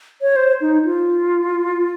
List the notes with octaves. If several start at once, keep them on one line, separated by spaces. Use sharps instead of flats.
C#5
C5
D#4
F4